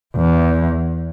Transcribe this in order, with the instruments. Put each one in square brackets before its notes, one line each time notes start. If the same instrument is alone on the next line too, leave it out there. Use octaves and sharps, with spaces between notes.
[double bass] E2